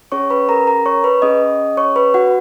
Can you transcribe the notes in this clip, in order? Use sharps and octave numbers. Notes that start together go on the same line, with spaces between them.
C#4 G#4 C#5 C#6
B4 B5
A#4 A#5
A#4 A#5
C#5 C#6
B4 B5
C#4 G#4 D#5 D#6
C#5 C#6
B4 B5
F#4 F#5